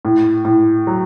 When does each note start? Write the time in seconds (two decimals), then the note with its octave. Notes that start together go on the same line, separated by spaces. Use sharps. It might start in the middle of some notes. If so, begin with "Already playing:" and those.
0.05 A2
0.45 A2
0.87 F#3